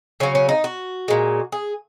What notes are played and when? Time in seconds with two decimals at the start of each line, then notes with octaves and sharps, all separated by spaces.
0.20 C#3 F#3 C#4
0.35 C#4
0.49 D#4
0.64 F#4
1.08 A#2 G#3
1.52 G#4